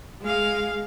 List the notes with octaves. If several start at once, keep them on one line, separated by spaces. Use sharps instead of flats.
G#3 F5